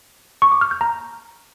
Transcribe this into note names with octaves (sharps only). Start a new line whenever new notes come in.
C#6
D6
F6
G6
A#5